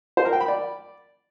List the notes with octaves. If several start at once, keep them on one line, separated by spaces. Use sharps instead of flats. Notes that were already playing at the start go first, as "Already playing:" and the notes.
C5
A#4
G5
B5
D5